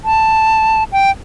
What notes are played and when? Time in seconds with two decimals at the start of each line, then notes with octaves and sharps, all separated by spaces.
0.05 A5
0.92 G5